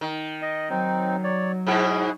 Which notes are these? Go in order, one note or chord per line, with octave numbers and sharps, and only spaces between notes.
D#3
D#5
F#3 C4 D#4
C#5 D5
G#2 B2 E4 G#4